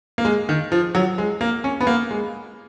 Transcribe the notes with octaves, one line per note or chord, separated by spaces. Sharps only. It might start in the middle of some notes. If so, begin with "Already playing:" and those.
A#3
G#3
D#3
F3
F#3
G#3
A#3
C#4
B3
A#3
G#3